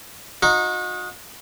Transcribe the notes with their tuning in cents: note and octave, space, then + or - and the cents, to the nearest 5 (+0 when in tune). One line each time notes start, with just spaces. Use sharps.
D#4 +0 F#4 -35